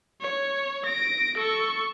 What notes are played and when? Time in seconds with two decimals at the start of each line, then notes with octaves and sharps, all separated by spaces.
0.22 C#5
0.86 A#6 D7
1.38 A4 C#6